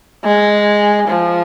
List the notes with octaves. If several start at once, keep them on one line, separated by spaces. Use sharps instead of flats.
G#3
F3